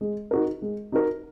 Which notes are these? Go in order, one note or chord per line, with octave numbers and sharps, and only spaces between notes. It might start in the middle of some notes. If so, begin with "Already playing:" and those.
G#3
D#4 F#4 A#4
G#3
D#4 F#4 A#4